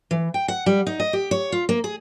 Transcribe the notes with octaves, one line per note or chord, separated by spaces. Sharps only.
E3
G5
F#5
G3
D#4
D#5
G4
C#5
F4
A#3
G#4